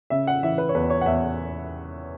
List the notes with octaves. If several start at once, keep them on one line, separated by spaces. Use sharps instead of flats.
C#3 E5
F#5
E3 E5
B4
C#5
E2 B4
C#5
F#5
E2 E5